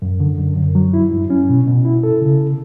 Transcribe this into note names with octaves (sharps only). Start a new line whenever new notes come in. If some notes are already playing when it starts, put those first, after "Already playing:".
F#2
D3
F#2
F#2
F#3
E4
G2
C#4
B2
B2
E4
A4
C#3